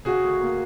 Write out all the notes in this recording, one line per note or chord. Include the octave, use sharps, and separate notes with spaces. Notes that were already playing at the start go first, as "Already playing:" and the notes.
C#3 F#4 G#4
D2
A#3